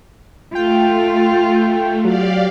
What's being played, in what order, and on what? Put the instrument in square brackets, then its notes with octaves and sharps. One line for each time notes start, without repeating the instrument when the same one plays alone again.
[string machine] A3 [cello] F4 [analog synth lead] G5
[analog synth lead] F#3 [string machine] G4 D5 F5